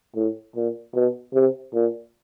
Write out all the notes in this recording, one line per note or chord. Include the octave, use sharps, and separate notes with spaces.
A2
A#2
B2
C3
A#2